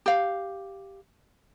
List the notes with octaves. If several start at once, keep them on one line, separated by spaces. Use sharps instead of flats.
G4 F5